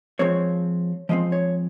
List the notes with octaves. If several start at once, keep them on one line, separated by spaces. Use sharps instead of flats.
F3 G#3 C4 C#5
F3 G#3 C4 D#5
C#5